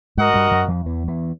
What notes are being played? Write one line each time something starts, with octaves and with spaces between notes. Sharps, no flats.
G#2 G#3 F#4 A#4 D#5 F#5
G2 G3
F#2 F#3
F2 F3
E2 E3
E2 E3